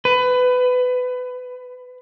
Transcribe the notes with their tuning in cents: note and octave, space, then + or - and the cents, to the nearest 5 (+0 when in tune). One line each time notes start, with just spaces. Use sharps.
B4 +20